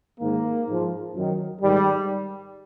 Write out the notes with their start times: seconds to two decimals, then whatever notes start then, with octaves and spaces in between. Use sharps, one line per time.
0.20 G#2 D#3 A#3
0.68 G#2 F3
1.16 F#2 D#3
1.62 G#2 D#3 G3